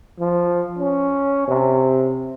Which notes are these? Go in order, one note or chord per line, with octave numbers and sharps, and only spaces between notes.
F3
C#4
C3